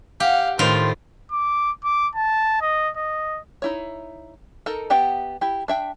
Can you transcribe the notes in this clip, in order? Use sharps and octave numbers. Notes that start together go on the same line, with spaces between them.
G4 F5 F#5
A2 D#3 F4 C5
D6
D6
A5
D#5
D#5
D#4 E4 C#5
D#4 A4 A#4
B3 G4 E5 F#5 G5
E4 G4
D4 E5 G5